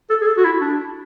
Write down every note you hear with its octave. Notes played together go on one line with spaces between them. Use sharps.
A4
G#4
A4
F#4
E4
D4